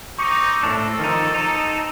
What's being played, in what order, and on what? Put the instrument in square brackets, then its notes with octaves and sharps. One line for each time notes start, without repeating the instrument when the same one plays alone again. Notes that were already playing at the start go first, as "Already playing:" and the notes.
[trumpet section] C4 D#4 [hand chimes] C#6 D6 C#7
[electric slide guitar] A2 D4 [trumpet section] C4 A4
[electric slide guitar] D#3 F3 D#4
D#4